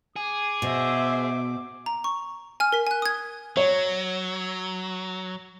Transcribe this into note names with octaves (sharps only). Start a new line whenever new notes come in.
G#4 D6
B2 C5 E5
A#5
C#6
G#5 F6
A#4 B6
G#5 F#6
D#6 G#6
F#3 C#5